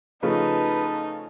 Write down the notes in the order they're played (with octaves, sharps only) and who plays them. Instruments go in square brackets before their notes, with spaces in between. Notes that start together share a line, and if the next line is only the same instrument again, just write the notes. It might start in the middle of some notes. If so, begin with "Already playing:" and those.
[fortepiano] C#3 F3 A3 [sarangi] D#4 [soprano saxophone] B4 [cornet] A5